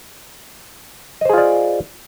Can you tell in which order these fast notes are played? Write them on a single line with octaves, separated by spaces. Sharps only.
D#5 C5 G#4 F4 D5